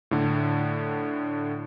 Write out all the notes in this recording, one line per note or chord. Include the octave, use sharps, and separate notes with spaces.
A2 D3